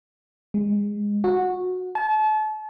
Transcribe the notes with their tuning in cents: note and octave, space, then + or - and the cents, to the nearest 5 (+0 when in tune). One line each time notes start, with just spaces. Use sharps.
G#3 -20
F#4 -15
A5 -35